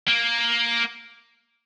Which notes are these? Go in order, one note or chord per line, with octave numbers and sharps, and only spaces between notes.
A#3